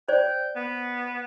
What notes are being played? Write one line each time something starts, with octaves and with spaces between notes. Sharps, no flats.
C5 D5 G5
B3